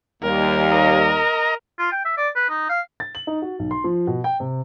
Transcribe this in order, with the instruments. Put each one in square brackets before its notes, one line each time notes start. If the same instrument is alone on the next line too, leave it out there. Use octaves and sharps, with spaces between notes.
[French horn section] D#2 [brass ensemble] G3 A#3 [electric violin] A#4
[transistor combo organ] D#5 A#5
[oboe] F4
G5
E5
D5
B4
D#4
F5
[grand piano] A6
F#7
D#4
F#4
B1
C6
F3
B2
G5
C3